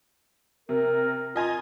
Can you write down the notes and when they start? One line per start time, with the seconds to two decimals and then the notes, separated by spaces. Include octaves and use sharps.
0.69 C3 A#4
1.36 F4 D#5 G#5 A#5